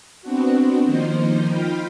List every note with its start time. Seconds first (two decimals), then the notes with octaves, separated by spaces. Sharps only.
0.22 B3 C4 D4 F#4
0.84 D#3 F3 A#3 D#4 C5
1.48 D#4 F4 F5 G5 B5